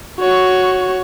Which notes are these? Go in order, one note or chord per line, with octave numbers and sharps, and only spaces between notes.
F#4 C#5